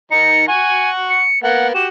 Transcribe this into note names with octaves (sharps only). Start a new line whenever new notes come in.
D#3 D#4 A#5 C#7
F#5 G#5 C#6
C#7
A#3 B3 F#5
F#4 G4 E7